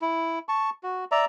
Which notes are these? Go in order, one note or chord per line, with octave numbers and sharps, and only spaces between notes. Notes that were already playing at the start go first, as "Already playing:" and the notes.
E4
A5 C#6
F#4
D5 E5 A#5